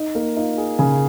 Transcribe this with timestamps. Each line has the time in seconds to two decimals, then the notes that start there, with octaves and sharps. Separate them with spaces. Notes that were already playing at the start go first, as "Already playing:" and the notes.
Already playing: D#4
0.15 A#3
0.37 D#4 F4
0.57 G#4
0.79 C#3 G#4